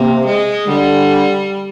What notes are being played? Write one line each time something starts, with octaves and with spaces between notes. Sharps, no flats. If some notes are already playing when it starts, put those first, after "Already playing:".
Already playing: C3 A#3
G#3
D3 G3